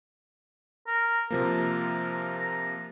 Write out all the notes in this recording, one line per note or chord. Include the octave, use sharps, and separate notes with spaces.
A#4
C3 F3 A#3 A#4
A#5